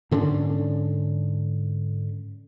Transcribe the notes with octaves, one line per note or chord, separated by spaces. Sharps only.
G#2 D3 C#4 D4